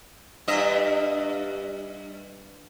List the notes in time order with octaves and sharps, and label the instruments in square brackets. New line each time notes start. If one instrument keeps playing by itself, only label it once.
[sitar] G2 D#5 E5